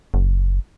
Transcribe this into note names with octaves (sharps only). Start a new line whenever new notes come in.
F#1